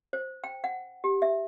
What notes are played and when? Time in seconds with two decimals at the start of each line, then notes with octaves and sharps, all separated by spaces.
0.13 C5
0.44 G5
0.64 F#5
1.04 G4
1.22 E5